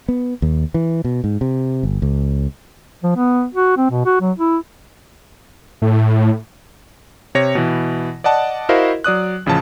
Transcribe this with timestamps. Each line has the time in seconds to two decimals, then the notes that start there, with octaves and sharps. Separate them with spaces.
0.08 B3
0.42 D#2
0.74 E3
1.05 B2
1.24 G#2
1.41 C3
1.83 G1
2.02 C#2
3.03 F3
3.17 B3
3.54 F#4
3.77 C4
3.91 B2
4.05 F#4
4.21 F#3
4.39 E4
5.82 A2
7.35 C3 C#5 A#6
7.55 B2 E3
8.24 D5 D#5 F#5 A5
8.69 E4 F#4 A#4 C5 D#5 F5
9.04 F#3 D5 D#6 F#6
9.46 A1 C#3 F3 A5